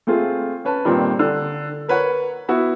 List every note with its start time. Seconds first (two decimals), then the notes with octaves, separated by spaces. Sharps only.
0.07 A3 C4 F4 G#4
0.65 C#4 B4 A5
0.85 G2 A#2 D#3 C4
1.19 D3
1.89 A#4 B4 C#5 F#5
2.49 B3 E4 F#4